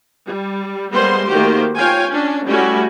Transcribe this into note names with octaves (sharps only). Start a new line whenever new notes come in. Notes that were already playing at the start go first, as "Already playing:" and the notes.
G3
G3 G#3 A#3 B3 C5 C6
D#3 A3 A#3 F#4 G4 C5
C4 F4 C#5 F5 G5 G#5
C#4 D4
G3 A3 C#4 E4 F#4 G4